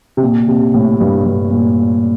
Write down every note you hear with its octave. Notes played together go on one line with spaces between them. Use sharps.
C3
A#2
C3
A2
G2
G2
A#2